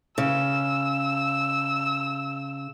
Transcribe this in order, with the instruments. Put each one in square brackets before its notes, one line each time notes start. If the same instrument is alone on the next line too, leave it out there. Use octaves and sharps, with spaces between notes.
[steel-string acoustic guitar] C#3 [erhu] E6